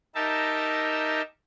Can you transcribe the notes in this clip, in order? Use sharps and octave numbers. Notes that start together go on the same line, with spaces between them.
D#4 G4 A#4 E5 A5